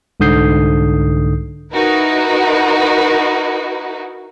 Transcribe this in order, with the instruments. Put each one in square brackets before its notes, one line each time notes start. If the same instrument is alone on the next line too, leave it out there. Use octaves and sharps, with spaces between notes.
[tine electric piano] C2 G#2 D3 D#6 G6 C7
[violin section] D#4 E4 F#4 A#4 B4